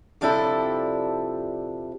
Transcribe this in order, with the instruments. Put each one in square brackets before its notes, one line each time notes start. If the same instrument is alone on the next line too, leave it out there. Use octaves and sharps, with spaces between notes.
[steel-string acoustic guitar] C3 F3 G3 D4 E4 A4